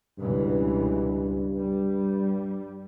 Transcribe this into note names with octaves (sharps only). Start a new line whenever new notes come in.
C#2 G2 B2 E3
G3